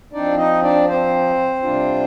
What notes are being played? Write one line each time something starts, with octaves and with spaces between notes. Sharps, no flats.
F3 C4 D4 D#4 D5
D#4 D#5
D4 D5
C4 C5
C3 G3 D4 F4